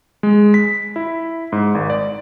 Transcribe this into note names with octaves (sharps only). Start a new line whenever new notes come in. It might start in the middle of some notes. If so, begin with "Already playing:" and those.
G#3
B6
E4
G#2
G#1
D5